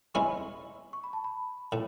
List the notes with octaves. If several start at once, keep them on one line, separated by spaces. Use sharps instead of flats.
G#3 C#4 E4 G#4 C#6
C#6
B5
A5
B5
A2